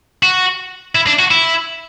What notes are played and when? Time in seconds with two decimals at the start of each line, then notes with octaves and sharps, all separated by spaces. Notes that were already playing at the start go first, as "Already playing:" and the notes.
0.23 F#4
0.95 E4
1.07 D4
1.19 F#4
1.31 E4